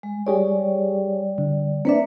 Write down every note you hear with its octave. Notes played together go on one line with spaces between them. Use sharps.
G#3
G3 G4 G#4 C#5 D5
D3
A#3 C4 D4 B4 D5 E5